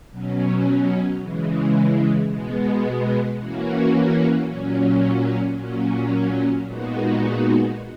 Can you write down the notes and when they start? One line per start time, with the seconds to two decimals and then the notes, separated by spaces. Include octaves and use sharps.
0.10 B2 F#3 C#4
1.19 C#3 E3 G#3
2.28 B2 G#3 B3
3.37 E3 A#3 C#4 F#4
4.47 A#2 F#3 C#4
5.56 A#2 F#3 C#4
6.65 A#2 G#3 B3 D#4 F#4